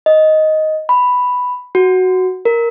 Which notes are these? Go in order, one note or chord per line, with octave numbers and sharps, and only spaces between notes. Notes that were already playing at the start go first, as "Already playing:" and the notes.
D#5
B5
F#4
A#4